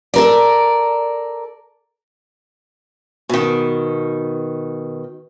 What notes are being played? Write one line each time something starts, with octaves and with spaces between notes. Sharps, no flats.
A4 A#4 D5
B2 D#3